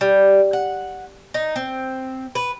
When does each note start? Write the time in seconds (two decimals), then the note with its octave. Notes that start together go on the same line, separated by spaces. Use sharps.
0.01 G3
0.53 F#5
1.34 D#4
1.56 C4
2.35 B4